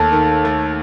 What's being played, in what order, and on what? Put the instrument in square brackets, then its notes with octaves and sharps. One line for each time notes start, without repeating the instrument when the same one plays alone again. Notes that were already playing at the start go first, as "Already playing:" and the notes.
Already playing: [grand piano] D#2 A3 [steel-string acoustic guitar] A4
[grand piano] D#3
A3